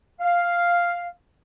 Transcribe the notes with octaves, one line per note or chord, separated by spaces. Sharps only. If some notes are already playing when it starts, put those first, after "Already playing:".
F5